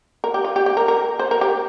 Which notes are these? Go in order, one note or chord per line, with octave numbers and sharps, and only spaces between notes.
A#4
G4
F4
G4
G4
A#4
A#4
C5
A#4
G4